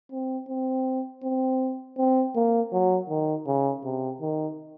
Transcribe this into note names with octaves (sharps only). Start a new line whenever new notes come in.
C4
C4
C4
C4
A#3
F#3
D#3
C#3
C3
D#3